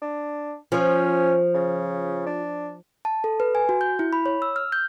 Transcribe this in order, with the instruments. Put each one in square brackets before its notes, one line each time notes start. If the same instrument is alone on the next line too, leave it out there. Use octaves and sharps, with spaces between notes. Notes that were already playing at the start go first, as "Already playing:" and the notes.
[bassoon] D4
[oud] F3 [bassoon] C#4
[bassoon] C#3
D4
[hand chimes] A5
A4
B4
G#5
F#4
G6
E4
B5
C#5
E6
F6
G6